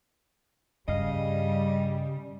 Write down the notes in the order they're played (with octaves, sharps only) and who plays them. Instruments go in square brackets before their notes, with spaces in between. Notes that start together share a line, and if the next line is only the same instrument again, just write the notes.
[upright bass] G2 [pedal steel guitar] C#3 F5 [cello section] G3 [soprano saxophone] D#5